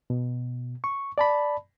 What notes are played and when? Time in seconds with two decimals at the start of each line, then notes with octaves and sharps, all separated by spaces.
0.10 B2
0.84 C#6
1.18 D5 A5 B5